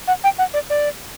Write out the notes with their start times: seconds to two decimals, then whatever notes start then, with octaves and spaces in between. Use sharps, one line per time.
0.07 F#5
0.24 G5
0.38 F#5
0.54 D5
0.70 D5